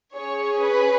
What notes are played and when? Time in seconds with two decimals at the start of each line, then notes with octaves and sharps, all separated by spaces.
0.16 C#4 G#4 C#5
0.63 B4